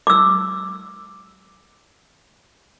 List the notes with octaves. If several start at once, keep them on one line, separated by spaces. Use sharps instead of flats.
D6 E6